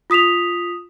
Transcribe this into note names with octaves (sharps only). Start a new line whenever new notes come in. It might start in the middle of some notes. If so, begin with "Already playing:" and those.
F4 D#6 B6 E7 F7